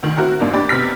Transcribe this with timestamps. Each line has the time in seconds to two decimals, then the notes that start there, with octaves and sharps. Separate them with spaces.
0.03 D2 D#3
0.17 C4 E4 F#4 A#4 F#5
0.39 A1 F#2 A#3 D4 D#4
0.53 D4 G4 B5 A6
0.69 C3 B3 F6 B6